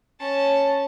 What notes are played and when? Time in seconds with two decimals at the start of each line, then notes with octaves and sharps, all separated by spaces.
0.19 C#4 A5